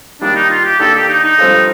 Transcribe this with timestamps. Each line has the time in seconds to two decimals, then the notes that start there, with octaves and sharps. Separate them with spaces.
0.21 D#3 G3 A#3 D4
0.35 D#4
0.50 F4
0.65 G4
0.80 D#3 A#3 D4 A4
0.94 G4
1.08 D#4
1.24 D#4
1.38 G2 F3 C4 F4 A4